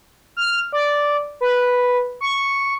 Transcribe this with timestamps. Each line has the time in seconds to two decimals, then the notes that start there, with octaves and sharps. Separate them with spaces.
0.37 F6
0.73 D5
1.41 B4
2.21 C#6